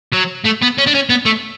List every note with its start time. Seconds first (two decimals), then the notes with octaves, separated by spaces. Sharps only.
0.12 F#3
0.44 A3
0.62 B3
0.78 C#4
0.86 D4
0.94 C#4
1.10 B3
1.26 A3